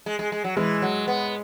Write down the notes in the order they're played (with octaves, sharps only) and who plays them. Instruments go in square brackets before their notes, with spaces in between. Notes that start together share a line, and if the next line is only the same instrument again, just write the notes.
[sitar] G#3
G#3
G#3
F#3
[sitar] E3 [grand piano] G#3
[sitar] F#3
B3